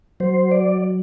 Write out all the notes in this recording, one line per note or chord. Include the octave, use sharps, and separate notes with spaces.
F#3 C5
D5